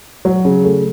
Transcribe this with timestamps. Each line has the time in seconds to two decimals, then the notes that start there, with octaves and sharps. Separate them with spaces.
0.25 F#3
0.45 C#3
0.64 A3